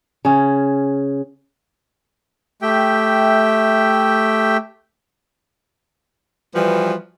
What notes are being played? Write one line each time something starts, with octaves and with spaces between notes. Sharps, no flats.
C#3 C#4
A3 G4 E5 G5
E3 F3 G3 F#4 B4